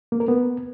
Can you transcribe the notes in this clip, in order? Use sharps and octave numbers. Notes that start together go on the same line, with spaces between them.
A#3
A#4
B3